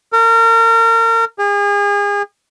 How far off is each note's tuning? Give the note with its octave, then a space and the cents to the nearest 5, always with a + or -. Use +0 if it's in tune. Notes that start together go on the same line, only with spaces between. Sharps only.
A#4 -35
G#4 -35